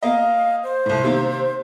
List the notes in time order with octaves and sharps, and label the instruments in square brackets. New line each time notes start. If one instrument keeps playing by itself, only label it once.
[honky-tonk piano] A#3 D#5 [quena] F5
[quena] C5
[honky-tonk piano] C2 A2
C3 D#3 A#3